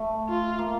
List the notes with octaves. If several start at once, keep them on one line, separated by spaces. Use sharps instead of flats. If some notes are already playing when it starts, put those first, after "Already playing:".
Already playing: A3
F4
A#3